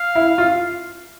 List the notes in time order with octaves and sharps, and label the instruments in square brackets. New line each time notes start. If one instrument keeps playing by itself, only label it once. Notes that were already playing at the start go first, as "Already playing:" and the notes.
Already playing: [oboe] F5
[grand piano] E4
F4